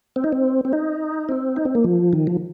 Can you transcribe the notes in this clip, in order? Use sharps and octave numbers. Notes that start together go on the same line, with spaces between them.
C4
D#4
C4
C4
D#4
C4
D#4
C4
A#3
F3
D#3
F3